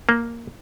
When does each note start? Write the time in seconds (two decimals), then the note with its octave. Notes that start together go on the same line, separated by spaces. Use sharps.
0.09 A#3